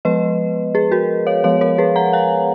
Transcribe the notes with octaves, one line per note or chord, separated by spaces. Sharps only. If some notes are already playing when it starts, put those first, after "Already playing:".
F3 G#3 B3 B4 D#5
G#4 B4
F#4 A#4
C#5 F5
F3 G#3 B3 C#5 F5
A#4 C#5
G#4 B4
F#5 A#5
F5 G#5